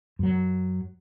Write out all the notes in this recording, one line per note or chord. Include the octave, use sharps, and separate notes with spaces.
F#2 F#3